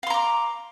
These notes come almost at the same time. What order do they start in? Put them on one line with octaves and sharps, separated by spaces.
F5 C6 A#5 D6